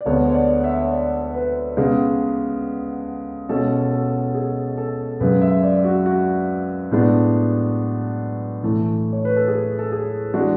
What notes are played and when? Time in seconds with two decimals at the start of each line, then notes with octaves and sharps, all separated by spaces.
0.01 D5
0.06 D2 D3 G#3 B3 C#5
0.30 C#5
0.34 D5
0.60 F#5
0.64 E5
0.82 C#5
0.92 D5
1.34 B4
1.77 C#3 G#3 B3
3.49 B2 G#3 C#4 A4
3.91 A4
4.34 G#4
4.78 A4
5.20 F#2 C#3 G#3 B4
5.41 E5
5.63 D5
5.84 F#4
6.06 F#4
6.91 A2 G#3 B3 D4
8.63 A2 E3 A3
9.13 C#5
9.25 B4
9.36 A4
9.48 G#4
9.79 A4
9.92 G#4
10.34 E3 G#3 D4 F#4